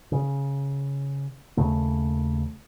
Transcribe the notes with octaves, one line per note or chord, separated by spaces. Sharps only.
C#3
D#2 C#3 A3